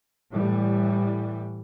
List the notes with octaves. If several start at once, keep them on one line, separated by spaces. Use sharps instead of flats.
A2 E3 G3